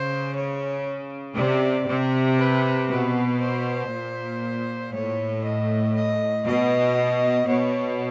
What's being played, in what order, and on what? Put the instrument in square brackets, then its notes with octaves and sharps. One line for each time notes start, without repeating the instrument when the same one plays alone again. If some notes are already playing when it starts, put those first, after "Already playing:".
Already playing: [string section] C#3 [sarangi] C5
[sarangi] C#5
[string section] C3 [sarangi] D5
[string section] C3
[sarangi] B4
[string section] B2 [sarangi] B4
[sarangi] C5
[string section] A#2
[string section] A2 [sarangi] C#5
[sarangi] D#5
D#5
[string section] B2 [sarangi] D#5
[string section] B2 [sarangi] C#5